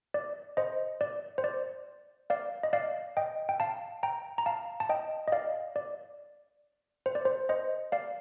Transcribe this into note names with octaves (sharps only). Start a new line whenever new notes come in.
D5
C5 D#5
D5
C5
D5
D5 F5
D#5
D5 F5
D#5 G5
G5
F5 A5
G5 A#5
A#5
F5 A5
A5
D#5 G5
D#5
D5 F5
D5
C5
D5
C5
C5 D#5
D5 F5